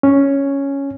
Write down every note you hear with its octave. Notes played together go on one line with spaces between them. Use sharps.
C#4